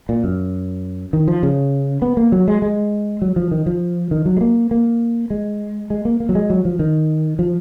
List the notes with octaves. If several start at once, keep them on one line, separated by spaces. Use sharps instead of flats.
A#2
F#2
D#3
F3
C#3
B3
A#3
F#3
G#3
G#3
F#3
F3
D#3
F3
D#3
F#3
G#3
A#3
A#3
G#3
G#3
A#3
A#3
F#3
G#3
F#3
F3
D#3
F3